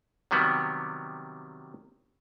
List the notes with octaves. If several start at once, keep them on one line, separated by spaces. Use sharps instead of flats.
C3 D#3 F#3 G3 B3